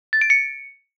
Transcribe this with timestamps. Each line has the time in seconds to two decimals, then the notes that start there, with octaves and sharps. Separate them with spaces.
0.13 A6
0.21 D7
0.30 C#7